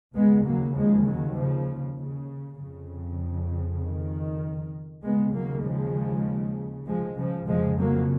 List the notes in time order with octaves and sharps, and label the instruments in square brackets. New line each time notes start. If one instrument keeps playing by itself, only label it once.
[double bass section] D#2 C#3 G#3 B3
F#3 A#3
F3 G#3
D#3 F#3
C#3 F3
C#3
F2 C#3
D#3
D#2 C#3 G#3 B3
F#3 A#3
F3 G#3
F3 G#3
C#3 F3
F2 C#3 F3 G#3
F#3 A#3